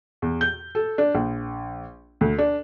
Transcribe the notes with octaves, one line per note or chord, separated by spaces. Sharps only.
E2
G6
A4
D4
A#1
D2
D4